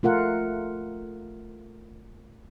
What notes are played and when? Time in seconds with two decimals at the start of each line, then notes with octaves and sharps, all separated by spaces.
0.03 A3 F4 A#4 F#5